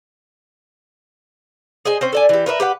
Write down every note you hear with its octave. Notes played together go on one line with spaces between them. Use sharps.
G#4 C5 D#5 G#5
C4 C#4 C5
A4 D5 G#5
E3 G4
A#4 B4 C#5 E5
G4 B4 F#5